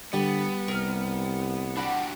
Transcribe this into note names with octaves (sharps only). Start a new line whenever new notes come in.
D3 G3 B3
C2 A#4 F6
D4 F#4 G4 D5 F#5 B5